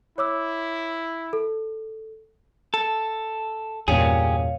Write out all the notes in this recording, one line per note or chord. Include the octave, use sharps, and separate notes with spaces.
E4 C#5 D6 E6
A4
A4
E2 G2 A#2 C#4 G4 G#4 C#5 F5